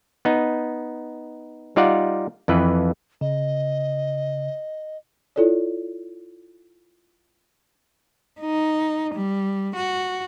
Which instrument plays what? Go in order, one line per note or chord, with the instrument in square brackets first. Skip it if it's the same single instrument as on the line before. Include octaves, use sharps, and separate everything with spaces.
[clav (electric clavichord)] B3 D#4
G3 D#4 F4 D5 F5 F#5
F2 E3 B4
[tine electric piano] C#3 [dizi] D#5
[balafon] E4 F4 A4 C#5 D5
[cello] D#4
G3
F#4